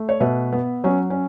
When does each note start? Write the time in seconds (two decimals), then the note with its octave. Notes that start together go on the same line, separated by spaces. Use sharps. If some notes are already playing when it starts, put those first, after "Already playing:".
Already playing: A3
0.09 C#5
0.20 B2 B4 E5
0.53 B3
0.84 F#3 C#4
1.10 C#4